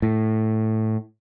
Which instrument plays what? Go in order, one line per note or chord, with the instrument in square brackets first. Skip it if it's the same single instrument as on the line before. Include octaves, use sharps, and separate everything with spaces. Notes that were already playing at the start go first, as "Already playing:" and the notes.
[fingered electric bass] A2